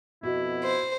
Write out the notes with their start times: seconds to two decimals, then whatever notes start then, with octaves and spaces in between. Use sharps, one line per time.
0.23 F2 B2 E4 F#4 D#5
0.64 C5